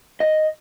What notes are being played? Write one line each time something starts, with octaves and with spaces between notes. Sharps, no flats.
D#5